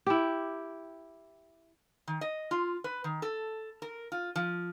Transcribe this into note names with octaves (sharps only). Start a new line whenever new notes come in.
E4 G4
D#3
D#5
F4
B4
D#3
A4
A#4
F4
F3